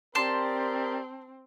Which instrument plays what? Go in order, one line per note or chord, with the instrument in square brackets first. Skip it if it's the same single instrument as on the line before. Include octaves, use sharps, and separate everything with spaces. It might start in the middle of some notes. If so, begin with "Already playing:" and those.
[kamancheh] C4 [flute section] G4 D5 [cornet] A#4 [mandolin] A5 C6